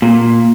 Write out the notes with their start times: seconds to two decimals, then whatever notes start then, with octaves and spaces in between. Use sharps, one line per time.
0.02 A#2